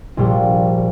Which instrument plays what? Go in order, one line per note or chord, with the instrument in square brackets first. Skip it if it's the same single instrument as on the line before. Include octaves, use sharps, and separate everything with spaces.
[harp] A#1 A#2 G3